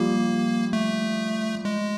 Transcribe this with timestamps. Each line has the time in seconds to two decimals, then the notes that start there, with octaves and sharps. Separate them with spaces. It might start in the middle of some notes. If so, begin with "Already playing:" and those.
Already playing: F3 G3 A#3
0.73 A3
1.65 G#3